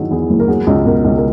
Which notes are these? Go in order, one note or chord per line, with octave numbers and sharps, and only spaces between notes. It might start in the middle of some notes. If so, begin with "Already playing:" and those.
Already playing: D#3 F#3 E4 G#4
E2 G#4
F#1
A#4
F#3 G#4
C#2
B2 A#4
C#2
A#4